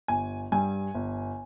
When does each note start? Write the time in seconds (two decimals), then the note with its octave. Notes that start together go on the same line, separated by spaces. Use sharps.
0.08 G1 G#5
0.52 G2 G3 G#5
0.95 G1